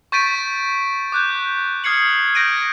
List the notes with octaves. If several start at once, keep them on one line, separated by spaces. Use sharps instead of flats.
C#6 G6 A6 B6 D7 D#7
D6 F#6 G6
D#6 F6 G#6 C7 C#7 F#7
G6 G#6 A#6 D7 D#7